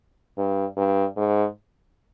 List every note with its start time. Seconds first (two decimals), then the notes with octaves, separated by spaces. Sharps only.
0.38 G2
0.77 G2
1.17 G#2